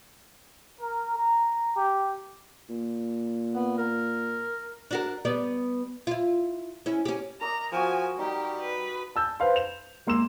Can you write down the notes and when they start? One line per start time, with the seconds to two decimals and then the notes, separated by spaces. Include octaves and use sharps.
0.80 A#4
1.17 A#5
1.76 G4
2.70 A#2
3.55 B3
3.78 A#4
4.91 D4 F#4 A#4
5.25 G3 B3 D5
6.07 E4 F4
6.86 C#4 E4
7.05 C#4 G4
7.41 A#4 D5 D#5 A#5
7.72 F3 F#4 G#5 D#6
8.19 G3 D#4 G4
8.60 B4
9.16 A5 E6 G6
9.40 B4 C5 F5 C6
9.56 E7 F7
10.07 G#3 A#3 C6 E6 E7